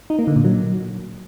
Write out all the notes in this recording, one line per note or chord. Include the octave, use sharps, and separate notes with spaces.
D#4
A#3
D3
A#2
F#3